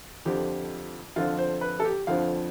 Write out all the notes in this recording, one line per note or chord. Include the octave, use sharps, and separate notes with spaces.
F2 D3 F3 G4
F2 D3 F3 F4
C5
B4
A4
G4
F2 D3 F3 F5